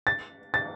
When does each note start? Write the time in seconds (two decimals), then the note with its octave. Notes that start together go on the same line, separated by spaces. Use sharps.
0.07 A6
0.54 A6